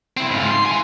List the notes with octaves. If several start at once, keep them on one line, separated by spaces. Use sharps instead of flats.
C4 E4
G#2 F4
C6
E3 G#5